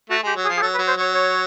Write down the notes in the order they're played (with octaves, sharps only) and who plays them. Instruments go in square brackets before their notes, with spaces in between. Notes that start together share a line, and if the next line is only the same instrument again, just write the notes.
[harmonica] A3 [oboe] F#4
[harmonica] G#3 [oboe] G4
[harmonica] F#3
[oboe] G#4
[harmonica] F3
[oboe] G#4
[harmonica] F#3 [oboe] A4
[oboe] B4
[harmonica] F#3
[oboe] C5
[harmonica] F#3 [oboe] C#5
[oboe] C#5